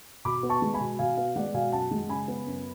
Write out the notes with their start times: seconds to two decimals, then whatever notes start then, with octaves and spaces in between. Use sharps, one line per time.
0.25 B2 B5 D6
0.43 B3
0.50 A5 C#6
0.62 G#3
0.74 G#5 B5
0.80 B2
0.99 B2 F5 G#5
1.17 B3 F5
1.36 G#3 D5 F#5
1.54 B2 F5 G#5
1.72 F#2 F#5 A5
1.91 G#3
2.09 C#3 G#5 B5
2.28 B3
2.47 F#2